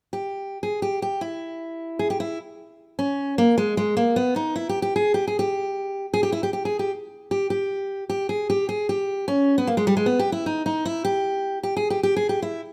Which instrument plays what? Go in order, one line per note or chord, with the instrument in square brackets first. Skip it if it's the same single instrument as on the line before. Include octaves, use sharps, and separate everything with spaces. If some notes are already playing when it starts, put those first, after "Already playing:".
[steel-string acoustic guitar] G4
G#4
G4
G4
E4
G#4
G4
E4
C#4
A#3
G#3
G#3
A#3
B3
D#4
E4
G4
G4
G#4
G4
G#4
G4
G#4
G4
E4
G4
G4
G#4
G4
G4
G4
G4
G#4
G4
G#4
G4
C#4
B3
A#3
G#3
G3
G#3
B3
G4
E4
D#4
D#4
E4
G4
G4
G#4
G4
G4
G#4
G4
E4